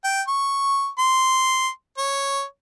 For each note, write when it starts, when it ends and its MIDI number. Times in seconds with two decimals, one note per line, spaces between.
0.04 0.22 79
0.28 0.88 85
0.98 1.69 84
1.98 2.44 73